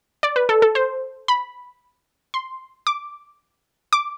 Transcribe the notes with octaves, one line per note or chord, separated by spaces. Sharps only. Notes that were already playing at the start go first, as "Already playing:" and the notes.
D5
B4
A4
A4
C5
B5
C6
D6
D6